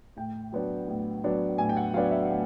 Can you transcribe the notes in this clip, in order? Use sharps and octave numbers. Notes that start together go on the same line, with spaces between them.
A2 G5
F#3 B3 D4
A2
F#3 B3 D4
A2 G#5
G5
F#5
F#3 B3 D4 F5
E5
A2